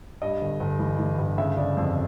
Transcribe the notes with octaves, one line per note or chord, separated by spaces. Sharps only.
G2 D#5
G1
G1
E3
E3
G1
C#3 E5
C#3 D5
F2